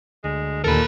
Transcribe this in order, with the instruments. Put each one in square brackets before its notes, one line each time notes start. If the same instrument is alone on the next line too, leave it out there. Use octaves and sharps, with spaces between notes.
[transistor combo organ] D2 [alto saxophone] G#3
[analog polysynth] D#2 A#2 A#3 [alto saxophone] A4 [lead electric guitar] A#4 B5